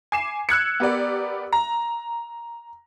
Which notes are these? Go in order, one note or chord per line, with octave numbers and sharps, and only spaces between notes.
G#5 D6 C7 E7
E6 F#6 G#6 C#7
B3 G4 A#4 D5
A#5